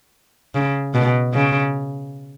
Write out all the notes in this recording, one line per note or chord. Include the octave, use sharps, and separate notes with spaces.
C#3
B2
C#3